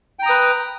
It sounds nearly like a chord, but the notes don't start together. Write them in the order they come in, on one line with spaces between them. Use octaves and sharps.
G5 A#5 D#6 B4